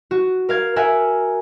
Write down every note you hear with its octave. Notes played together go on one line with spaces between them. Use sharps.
F#4
A#4 F5 G#6
A#4 E5 F#5 G#5